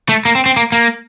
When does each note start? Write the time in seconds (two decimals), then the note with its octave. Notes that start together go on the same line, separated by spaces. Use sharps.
0.09 A3
0.25 A#3
0.35 C4
0.46 C4
0.56 A#3
0.72 A#3